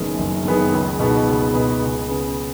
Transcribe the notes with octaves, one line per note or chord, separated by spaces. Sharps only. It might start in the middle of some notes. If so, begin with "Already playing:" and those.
Already playing: F#1 F#2 D#3 B3 G#4
F#1
F#2 D#3 B3 G#4
C#2
B2 B3 D#4 G#4
C#2
B2 B3 D#4 G#4
C#2
C#3 B3 G#4